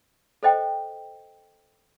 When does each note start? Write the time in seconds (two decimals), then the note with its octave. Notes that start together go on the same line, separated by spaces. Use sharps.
0.43 A4 C5 D#5 G5